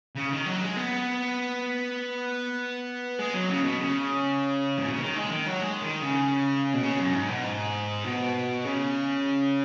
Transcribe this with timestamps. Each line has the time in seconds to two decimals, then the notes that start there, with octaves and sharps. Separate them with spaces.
0.16 C#3
0.31 D#3
0.46 F#3
0.61 G#3
0.77 B3
3.19 G#3
3.34 F#3
3.49 C#3
3.64 B2
3.79 C#3
4.78 G#2
4.86 B2
4.93 C#3
5.00 D#3
5.16 G#3
5.32 D#3
5.46 F#3
5.62 G#3
5.82 D#3
6.02 C#3
6.74 B2
6.83 C#3
6.98 F#2
7.13 G#2
7.28 B2
7.44 G#2
8.04 B2
8.64 C#3